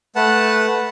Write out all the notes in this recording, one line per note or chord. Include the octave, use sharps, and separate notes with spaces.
A3 B4 F#5 A5